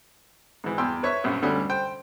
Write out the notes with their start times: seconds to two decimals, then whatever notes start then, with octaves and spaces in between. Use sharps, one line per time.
0.64 G#2 E3
0.78 E2 G5 C6 E6
1.03 B4 C#5 E5 C#6
1.24 A#1 F#2
1.42 D2 D3 G3 C#4 F#5
1.69 C5 G5